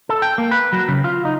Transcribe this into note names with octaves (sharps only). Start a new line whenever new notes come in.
A4
G5
A#3
B4
F#3
C#3
F4
D#4